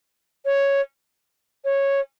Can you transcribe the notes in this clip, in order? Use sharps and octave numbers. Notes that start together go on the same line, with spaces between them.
C#5
C#5